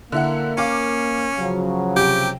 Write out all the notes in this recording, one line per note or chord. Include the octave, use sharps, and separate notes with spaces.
D3 A#3 E4 F#5
C#4 F5 D6
C#3 F3 F#3
C3 G4 G5